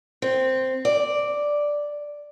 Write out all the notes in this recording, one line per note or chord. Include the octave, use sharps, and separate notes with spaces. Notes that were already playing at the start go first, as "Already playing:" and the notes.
C4
D5